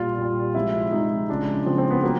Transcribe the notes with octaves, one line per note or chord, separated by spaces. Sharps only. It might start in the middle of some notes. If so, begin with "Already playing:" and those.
Already playing: A#2 G3 F4
A#2 G3
C3 F3 G#3 E4
C3 F3 G#3 D#4
C#3 F3 G#3 D4
C#3 F3 G#3 C4
C4
B3
F#3 A#3